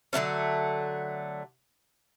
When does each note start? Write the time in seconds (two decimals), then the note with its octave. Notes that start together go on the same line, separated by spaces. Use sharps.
0.13 D3 F#3 A3 C#4